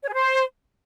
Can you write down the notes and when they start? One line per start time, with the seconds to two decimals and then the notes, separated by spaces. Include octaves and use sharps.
0.03 C#5
0.08 G#4
0.13 C5